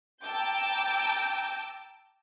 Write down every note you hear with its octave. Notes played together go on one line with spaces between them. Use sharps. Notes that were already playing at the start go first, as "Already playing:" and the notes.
G5 A5 A#5 D6 E6 G6